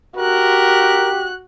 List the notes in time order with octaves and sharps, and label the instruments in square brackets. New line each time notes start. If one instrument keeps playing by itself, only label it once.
[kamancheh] F#4 F#6 [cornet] G4 [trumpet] A#4